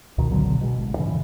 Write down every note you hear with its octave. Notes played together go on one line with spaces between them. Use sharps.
C#2 B2 D#3
G#1 B2 D3 F#3
B2 G#3
A1
G2 C#3 E3